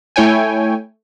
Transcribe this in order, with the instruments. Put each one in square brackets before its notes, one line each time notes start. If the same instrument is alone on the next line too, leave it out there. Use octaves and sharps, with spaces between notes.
[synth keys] A3 E4 C#5 G5 G#5